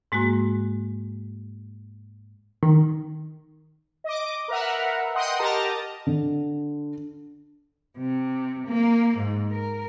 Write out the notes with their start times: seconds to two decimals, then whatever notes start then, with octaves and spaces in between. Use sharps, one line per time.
0.12 G#2 G#3 A#3 F#4
2.63 D#3
4.04 D#5 D6
4.48 A#4 B4 E5 F#5
5.14 D#5 F#5 G5 C6 D#6
5.39 G4 A#4 D#5 A5 A#5
6.07 D3
7.98 C3
8.67 A#3
9.17 G#2
9.51 A#4